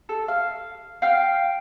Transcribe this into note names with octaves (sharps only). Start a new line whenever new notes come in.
A4
F5
F5 G5 F6